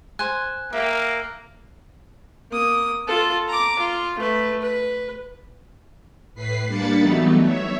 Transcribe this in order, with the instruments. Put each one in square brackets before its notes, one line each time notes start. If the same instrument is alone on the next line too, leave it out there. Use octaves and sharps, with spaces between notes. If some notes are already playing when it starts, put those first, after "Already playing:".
[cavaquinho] C5 G#5 [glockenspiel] F#6
[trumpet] A#3 [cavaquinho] E5 G5
[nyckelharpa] A#3 D#6
F4 A4
A#5 D6
F4
A3 B4
B4
[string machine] A2 B4 B6 C7
G3 A#3 D4 B5 A6 C#7
E3 F#3 G3 A3 B3 D#4
C#5 E5